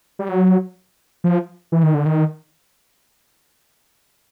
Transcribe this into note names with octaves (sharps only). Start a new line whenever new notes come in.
G3
F#3
F3
E3
D#3
D3
D#3